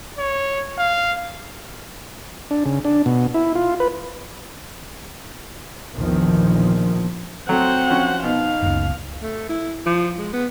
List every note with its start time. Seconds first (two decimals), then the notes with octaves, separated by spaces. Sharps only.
0.18 C#5
0.78 F5
2.51 D4
2.66 C#3
2.85 D4
3.06 B2
3.34 E4
3.55 F4
3.80 B4
5.94 A#1 E2 A#2 D#3 F3
7.49 F#3 A3 C4 C5 F#5
7.90 F3 C#4 F#4
8.23 B2 D#4 F5
8.62 F#1 C#2
9.22 A3
9.49 E4
9.86 F3
10.18 G#3
10.33 B3